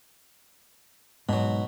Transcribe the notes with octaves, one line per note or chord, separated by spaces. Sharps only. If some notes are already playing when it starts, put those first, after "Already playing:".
G#2 B2 F#3